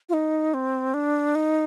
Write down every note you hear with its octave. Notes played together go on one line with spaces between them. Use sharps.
F4
D#4
C4
D4
D#4